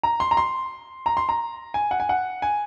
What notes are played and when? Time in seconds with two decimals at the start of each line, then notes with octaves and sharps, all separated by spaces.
0.03 A#5
0.20 C6
0.31 A#5
0.37 C6
1.06 A#5
1.17 C6
1.29 A#5
1.74 G#5
1.91 F#5
2.00 G#5
2.09 F#5
2.42 G#5